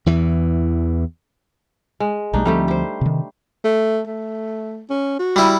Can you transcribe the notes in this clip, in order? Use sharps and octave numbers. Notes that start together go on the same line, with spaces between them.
E2 E3
G#3
B1 G3 A3 D4 D#4
D2 F3 G3 A3 C4 G4
G4 C5
C3 D#3
A3
A3
C#4
F#4
G3 E4